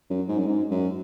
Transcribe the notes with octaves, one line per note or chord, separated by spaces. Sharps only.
F#2
G#2
F#2
G#2
F#2